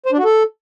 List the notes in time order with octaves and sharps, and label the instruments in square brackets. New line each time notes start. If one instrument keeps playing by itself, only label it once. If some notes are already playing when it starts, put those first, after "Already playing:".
[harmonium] C5
D4
F#4
A4